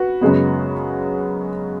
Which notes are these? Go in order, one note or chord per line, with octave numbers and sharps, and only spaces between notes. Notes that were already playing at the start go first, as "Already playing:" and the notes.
Already playing: F#4 B4
F#2 C#3 G#3 B3